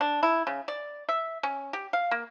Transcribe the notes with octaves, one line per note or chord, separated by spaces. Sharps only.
D4
E4
C#3
D5
E5
C#4
G4
F5
A#3